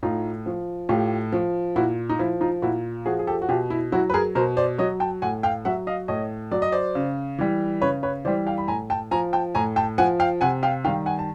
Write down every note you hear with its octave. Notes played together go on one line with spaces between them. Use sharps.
A2 D#4 F4
F3
A2 F4 G4
F3
A#2 E4 F#4
D#4
F3 E4
D#4 F4
A#2 E4 F#4
F3 F#4 G#4
G#4
G4 A4
F#4
B2 F4 G4
E4
F#3 E4 F#4
B4
G#4 A#4
B2 A#4 C5
C5 D5
F#3 C#5 D#5
G5 A5
A2 F#5 G#5
F5 G5
F#3 E5 F#5
D#5 F5
A2 C#5 D#5
F#3 D5
D#5
C5 D5
C#3
E3 G3
C#3 B4 C#5
B4 C#5
E3 G3 C5 D5
F5 G5
B5
A2 G#5 A#5
G5 A5
F3 G#5 A#5
G5 A5
A2 G#5 A#5
G5 A5
F3 F#5 G#5
F5 G5
C3 F#5 G#5
F5 G5
D#3 G3 F5 G5
F#5 G#5
A5